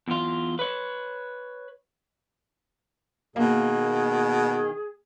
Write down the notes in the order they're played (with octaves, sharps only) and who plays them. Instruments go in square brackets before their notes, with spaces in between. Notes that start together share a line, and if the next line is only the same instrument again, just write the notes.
[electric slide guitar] E2 F4
B4 C#5
[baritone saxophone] B2 [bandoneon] D#3 [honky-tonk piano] A#3 [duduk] G#4